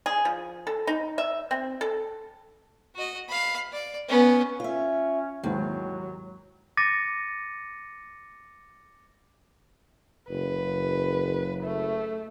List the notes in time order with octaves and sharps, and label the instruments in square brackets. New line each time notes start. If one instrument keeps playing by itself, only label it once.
[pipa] G#4
F3
A4
D#4
E5
C4
A4
[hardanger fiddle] F#4 D#5
F5 B5
D5
B3 C#4
[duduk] C#4 [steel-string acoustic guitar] F4 E5
[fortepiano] D#2 G#2 E3 [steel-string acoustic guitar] D#3 [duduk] F#3
[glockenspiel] D6 A6 A#6 C#7 D#7
[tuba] F#1 [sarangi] B4
[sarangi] A3